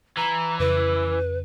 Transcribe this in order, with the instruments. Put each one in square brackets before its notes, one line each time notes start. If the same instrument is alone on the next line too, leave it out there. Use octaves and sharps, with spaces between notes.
[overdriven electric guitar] E3 [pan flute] A#5
[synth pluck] F2 C#3 [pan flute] B4